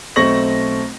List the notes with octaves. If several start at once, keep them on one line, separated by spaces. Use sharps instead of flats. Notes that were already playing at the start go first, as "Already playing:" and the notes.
B1 A3 C4 C#6 A#6 F#7